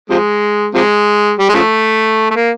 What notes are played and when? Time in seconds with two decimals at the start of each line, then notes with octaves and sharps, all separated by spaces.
0.10 C3 F3 G#3
0.74 C3 F3 G#3
1.39 G3
1.49 G#3
1.54 C#3 F3 A3
2.31 A3
2.35 A#3